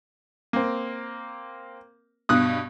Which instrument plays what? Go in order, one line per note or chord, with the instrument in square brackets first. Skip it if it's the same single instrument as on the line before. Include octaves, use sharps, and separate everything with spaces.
[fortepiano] A#3 C4
[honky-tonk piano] G2 B2 [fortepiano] D#6 F#6